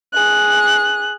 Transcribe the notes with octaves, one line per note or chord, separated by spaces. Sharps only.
G#4 F#6